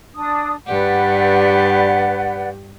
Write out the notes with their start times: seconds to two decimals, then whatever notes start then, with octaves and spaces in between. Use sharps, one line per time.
0.15 D4 D#6
0.67 G2 G4 B4 D5 F#5